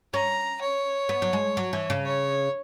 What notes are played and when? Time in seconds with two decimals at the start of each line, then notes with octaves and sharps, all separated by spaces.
0.13 C#4 A#5
0.61 C#5
1.09 B3
1.22 F#3
1.33 G#3
1.57 F#3
1.73 E3
1.90 C#3
2.05 C#5